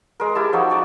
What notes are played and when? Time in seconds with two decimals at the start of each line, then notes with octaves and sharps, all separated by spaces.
0.20 G#3 A#4
0.35 E4 G4 A5
0.53 F3 D#4 F#4
0.70 F#4 D5 A#5